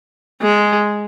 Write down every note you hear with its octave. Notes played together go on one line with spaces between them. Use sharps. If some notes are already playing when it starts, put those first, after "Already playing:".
G#3